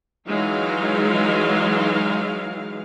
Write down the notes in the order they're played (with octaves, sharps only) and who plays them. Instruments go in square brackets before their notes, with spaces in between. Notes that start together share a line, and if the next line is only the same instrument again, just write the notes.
[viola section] E3 F#3 G#3 D#4 F5